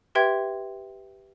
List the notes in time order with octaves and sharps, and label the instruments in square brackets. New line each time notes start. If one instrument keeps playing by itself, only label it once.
[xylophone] G4 B4 E5 G5 C6 G#6